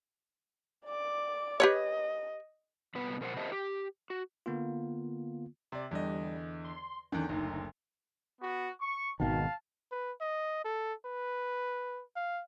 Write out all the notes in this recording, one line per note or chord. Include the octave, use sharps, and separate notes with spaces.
D5 D6
G4 B4 C#5 D#5
G2 C3 B3 B4
B2 A#4 C5 F#5
G4 A#4 C5 D#5 E5 A5
G4
F#4
D3 A#3 B3 F4
C3 D5
E2 D3 G3 D#5
C6
E2 D3 D#3 C#4
F#1 D2 D#4
B3 F#4
C#6
G#1 B2 D#3 F5 A5
B4
D#5
A4
B4
F5